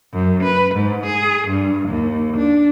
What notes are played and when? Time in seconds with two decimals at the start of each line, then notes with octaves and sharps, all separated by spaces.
0.13 F#2
0.44 B4
0.75 G#2
1.07 G#4
1.48 G2
1.88 D#2
2.37 D4